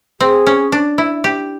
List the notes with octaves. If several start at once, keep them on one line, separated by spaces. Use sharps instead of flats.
C4 G#4
C#4
D4
E4
G4